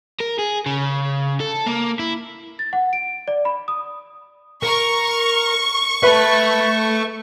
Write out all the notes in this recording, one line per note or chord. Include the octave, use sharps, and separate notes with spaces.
A#4
G#4
C#3
A4
A#3
E4
A6
F#5
D7
D5
B5
D#6
A#4 C#6
A4 B4 E5